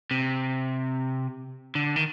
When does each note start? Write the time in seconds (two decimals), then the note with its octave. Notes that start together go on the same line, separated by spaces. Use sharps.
0.11 C3
1.75 D3
1.96 D#3